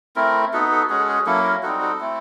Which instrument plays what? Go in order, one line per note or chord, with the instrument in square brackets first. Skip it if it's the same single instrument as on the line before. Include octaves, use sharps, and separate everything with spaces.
[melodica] A3 C4 E4 A#4
B3 D#4 F#4 A4
A4
G#3 C#4 F#4 G#4
A4
G#4
F#3 A#3 C#4 E4 A4
A#4
G3 C4 D#4 F#4 A4
A4
A3 C4 E4